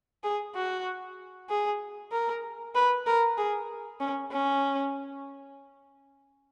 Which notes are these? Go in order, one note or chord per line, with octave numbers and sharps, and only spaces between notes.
G#4
F#4
G#4
A#4
B4
A#4
G#4
C#4
C#4